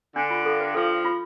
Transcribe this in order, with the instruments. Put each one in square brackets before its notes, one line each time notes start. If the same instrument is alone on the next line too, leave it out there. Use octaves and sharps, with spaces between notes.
[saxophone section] D3 [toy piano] D4
[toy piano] F4
[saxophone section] G2 [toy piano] A4
[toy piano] B4
[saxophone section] F3 [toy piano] A4
[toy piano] F4